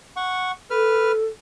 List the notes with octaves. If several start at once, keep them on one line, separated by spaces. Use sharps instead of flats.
F#5 C#6
A4 B4 F6